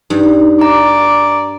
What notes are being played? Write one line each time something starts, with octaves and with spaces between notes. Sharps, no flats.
G2 G3 D#4
D5 A#5 D6